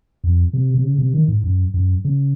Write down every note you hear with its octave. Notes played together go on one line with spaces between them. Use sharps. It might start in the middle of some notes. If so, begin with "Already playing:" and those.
F2
C3
C3
C#3
C3
D#3
G#2
F#2
F#2
C#3